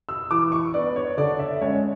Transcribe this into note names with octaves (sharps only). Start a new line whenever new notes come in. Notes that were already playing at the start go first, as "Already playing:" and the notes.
E6
E3 D6
C#6
B3 D4 D5
C#5
D3 D5
E5
G#3 C#4 C#5